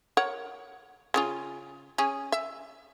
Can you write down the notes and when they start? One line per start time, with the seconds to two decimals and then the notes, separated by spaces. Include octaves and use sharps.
0.17 A#4 C#5 F#5
1.14 C#3 C#4 F4
1.98 C#4 G#4
2.32 E5